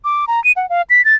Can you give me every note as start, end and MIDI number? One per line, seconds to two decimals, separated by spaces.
0.05 0.25 86
0.28 0.42 82
0.44 0.52 99
0.56 0.68 78
0.70 0.82 77
0.90 1.04 95
1.05 1.15 93